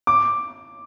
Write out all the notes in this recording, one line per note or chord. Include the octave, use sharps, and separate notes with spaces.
D6